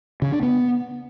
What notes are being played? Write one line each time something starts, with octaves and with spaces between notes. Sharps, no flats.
C#3
D4
B3